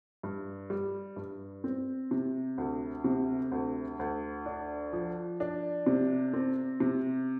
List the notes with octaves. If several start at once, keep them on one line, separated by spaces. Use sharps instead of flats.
G2
G3
G2
C4
C3
D2
C3
D2
D2
D4
F3
D4
C3
C4
C3